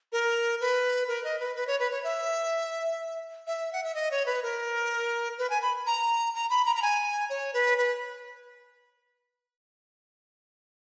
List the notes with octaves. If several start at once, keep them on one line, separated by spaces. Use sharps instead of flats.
A#4
B4
A#4
D#5
B4
B4
C#5
B4
C#5
E5
E5
F#5
E5
D#5
C#5
B4
A#4
B4
G#5
B5
A#5
A#5
B5
A#5
A#5
G#5
C#5
B4
B4